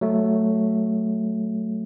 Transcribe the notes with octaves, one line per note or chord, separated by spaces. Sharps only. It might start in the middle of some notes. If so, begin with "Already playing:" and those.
F#3 A3